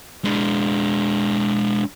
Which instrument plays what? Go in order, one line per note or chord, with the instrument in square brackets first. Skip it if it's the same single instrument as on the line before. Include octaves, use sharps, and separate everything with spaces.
[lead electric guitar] G#3 D4